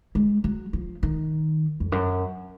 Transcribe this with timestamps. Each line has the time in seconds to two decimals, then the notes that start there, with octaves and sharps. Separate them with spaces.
0.15 G#3
0.44 F#3
0.73 F3
1.03 D#3
1.80 F2
1.92 F#2